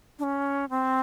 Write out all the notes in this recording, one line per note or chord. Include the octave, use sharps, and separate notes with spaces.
D4
C#4
C4